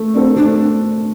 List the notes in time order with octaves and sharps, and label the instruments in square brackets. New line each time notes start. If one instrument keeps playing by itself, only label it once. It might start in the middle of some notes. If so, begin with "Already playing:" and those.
Already playing: [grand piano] A3
[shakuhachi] C4 [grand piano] D4
[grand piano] A4 C5
[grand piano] A3 [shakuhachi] D4